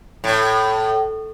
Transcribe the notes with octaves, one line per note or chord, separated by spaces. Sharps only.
A2